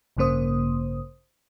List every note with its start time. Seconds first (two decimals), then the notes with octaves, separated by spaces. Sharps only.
0.17 A1 G2 C#3 A#3 C5 D#6